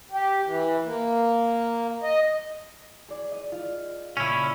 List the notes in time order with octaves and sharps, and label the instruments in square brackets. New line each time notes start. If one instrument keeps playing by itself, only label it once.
[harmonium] G4
E3
A#3
D#5
[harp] G#4 D5
D#5
F4
[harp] A#2 C#3 [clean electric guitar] C#4 E4